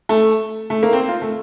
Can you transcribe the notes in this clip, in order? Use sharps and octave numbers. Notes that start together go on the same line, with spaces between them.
A3
A3
A#3
C4
F4
A3